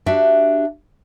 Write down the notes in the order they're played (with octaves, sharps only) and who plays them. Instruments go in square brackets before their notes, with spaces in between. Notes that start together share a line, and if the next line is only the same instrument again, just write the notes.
[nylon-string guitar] D4 F#4 G4 E5